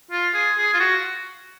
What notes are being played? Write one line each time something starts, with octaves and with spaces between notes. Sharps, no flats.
F4
G#4
G#4
F4
F#4